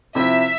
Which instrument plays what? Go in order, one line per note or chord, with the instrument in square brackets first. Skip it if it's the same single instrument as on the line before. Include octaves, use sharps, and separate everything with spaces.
[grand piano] C3 F3 C4 E4 [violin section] E5